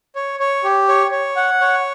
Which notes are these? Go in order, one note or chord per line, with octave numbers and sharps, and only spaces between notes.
C#5
C#5
G4
C#5
C#5
F#5
C#5